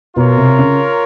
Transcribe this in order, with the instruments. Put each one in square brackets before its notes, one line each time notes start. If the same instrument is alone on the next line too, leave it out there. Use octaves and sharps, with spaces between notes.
[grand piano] B2 [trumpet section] F4 A#4 C#5
[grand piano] C3
C#3